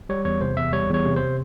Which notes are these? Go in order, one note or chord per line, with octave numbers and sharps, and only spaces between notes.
G3 C#5
E2 C#5
C3 C5
E2 E5
G3 C#5
E2 C#5
C3
C5